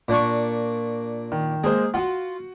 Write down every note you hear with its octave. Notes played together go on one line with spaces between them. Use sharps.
A#2 D4 C#6
D#3
G#3 A#3 G#4 C5
F4 F#4 F#5